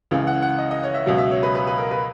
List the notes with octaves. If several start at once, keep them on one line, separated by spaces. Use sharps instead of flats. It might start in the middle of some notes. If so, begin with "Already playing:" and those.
C#2 C#3 E3
F#5
F#5
D#5
D#5
C#5
E5
C#2 B2 F#3
E5
C#5
B4
B4
B4
A#4
B4